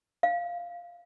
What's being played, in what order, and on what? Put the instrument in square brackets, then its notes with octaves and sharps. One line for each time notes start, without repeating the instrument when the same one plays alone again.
[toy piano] F5